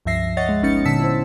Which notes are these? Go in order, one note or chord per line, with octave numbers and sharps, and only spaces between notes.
C#2 G2 F3 E5 A#6 C7
C#5 D#5 F#5 A6
G#3
G1 B3 C#4 D#4 A6 C#7
A#2 D3 A5 E6 B6
E4 C5